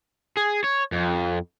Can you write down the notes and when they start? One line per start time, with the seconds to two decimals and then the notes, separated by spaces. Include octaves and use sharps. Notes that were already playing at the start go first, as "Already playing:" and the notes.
0.37 G#4
0.64 C#5
0.92 F2